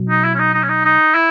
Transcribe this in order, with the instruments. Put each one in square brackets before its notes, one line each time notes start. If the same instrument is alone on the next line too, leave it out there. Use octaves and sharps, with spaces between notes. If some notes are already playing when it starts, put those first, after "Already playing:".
Already playing: [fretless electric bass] B2 F#3
[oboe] D#4
E4
C#4
D#4
D#4
C#4
D#4
D#4
E4